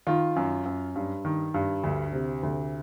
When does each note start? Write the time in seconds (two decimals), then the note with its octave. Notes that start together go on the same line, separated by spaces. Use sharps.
0.07 D#3 F4
0.36 F#2
0.66 F#2
0.96 G2
1.25 D#3
1.54 G2
1.83 D2
2.13 C3
2.43 D2